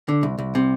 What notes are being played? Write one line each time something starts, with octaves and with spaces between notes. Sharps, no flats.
D3
C2
C2
C3